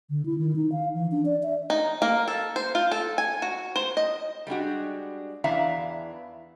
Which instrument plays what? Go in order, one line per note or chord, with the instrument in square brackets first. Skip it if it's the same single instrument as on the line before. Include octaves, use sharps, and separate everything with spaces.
[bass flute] D3
E4
D#3
D#4
F5
E3
D4
D5
E5
[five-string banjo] D#4
A#3
A4
C5
F4
A4
G#5
F#4
C5
D#5
[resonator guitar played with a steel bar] G3 G#3 D4 F#4
E2 E3 D4 E5 F5 A#5